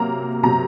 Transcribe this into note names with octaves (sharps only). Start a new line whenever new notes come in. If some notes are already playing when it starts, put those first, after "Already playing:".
Already playing: C3 F#3 A#3 A#5
C3 F#3 A#3 A#5